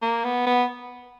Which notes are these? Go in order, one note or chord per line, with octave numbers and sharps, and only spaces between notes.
A#3
B3
B3